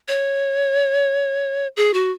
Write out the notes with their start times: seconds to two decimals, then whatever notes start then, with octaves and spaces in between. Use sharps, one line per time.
0.08 C#5
1.77 G#4
1.94 F#4